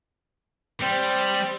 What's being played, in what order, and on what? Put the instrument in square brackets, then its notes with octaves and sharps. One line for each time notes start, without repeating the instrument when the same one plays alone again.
[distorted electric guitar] G3 [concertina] C4